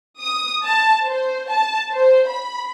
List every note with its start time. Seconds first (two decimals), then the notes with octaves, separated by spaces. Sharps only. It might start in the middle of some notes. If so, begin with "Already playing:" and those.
0.20 D#6
0.63 A5
1.05 C5
1.49 A5
1.91 C5
2.28 B5